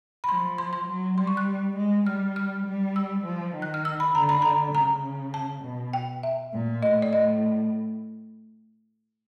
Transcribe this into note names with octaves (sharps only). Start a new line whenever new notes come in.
B5
F3 C6
C6
C6
F#3
G3 C6
C#6
F#6
G#3
G3 F6
F6
G3
E6
F3
D#3
F#6
F6
E6
B5
D3 A#5
B5
A#5
C#3 A#5
A5
B2
G5
E5
A#2
A2 D#5
D5
A2 D#5